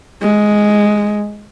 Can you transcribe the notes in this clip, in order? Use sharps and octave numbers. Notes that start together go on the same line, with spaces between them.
G#3